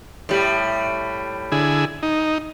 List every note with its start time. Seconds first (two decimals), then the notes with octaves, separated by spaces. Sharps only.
0.29 A2 G3
1.52 D3 E4 G#4
2.03 D#4